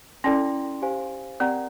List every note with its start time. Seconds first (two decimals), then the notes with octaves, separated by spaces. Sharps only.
0.24 C#4 E4 A4 D5 G5 C6
0.82 G4 C5 F5 G#5
1.40 C4 G4 A#4 D5 F#5 A#5